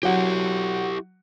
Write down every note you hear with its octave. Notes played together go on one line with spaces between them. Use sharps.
F#3 E4 G4 F#5